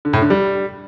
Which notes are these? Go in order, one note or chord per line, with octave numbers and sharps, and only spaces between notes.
D3
A2
D3
G3